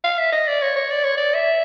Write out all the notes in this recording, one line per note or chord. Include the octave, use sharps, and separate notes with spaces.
F5
E5
D#5
D5
C#5
C#5
D5
C#5
D5
E5